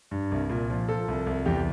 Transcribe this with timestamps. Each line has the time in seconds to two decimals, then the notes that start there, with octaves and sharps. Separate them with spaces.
0.11 G2
0.32 C2
0.50 A#2
0.70 F3
0.89 F3 A4
1.08 C2
1.27 C2
1.46 E2 G4